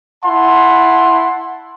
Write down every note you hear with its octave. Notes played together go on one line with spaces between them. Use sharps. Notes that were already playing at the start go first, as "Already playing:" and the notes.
E4 F#5 A5 C6